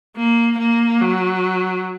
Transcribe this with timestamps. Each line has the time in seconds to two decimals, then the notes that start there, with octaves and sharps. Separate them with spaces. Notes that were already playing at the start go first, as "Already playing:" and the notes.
0.16 A#3
0.58 A#3
1.02 F#3